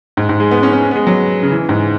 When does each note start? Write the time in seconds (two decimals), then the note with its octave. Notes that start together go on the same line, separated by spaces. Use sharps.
0.17 G#2
0.29 G#2
0.40 G#3
0.51 B3
0.63 C#4
0.73 C#4
0.91 B3
0.96 G#3
1.07 F#3
1.43 C#3
1.52 E3
1.69 G#2